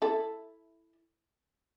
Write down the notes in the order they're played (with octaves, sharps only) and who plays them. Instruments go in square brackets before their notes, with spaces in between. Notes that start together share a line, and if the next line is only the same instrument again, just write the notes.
[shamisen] E4 A4